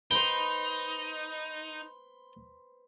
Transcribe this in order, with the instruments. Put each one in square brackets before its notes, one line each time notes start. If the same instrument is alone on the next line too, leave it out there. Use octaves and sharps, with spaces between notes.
[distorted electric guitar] D#4 [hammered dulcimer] B4 C5 [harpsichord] G5